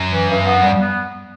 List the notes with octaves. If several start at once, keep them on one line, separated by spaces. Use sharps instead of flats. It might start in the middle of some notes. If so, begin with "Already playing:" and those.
Already playing: F#2
E3
G2
B3
G3
B3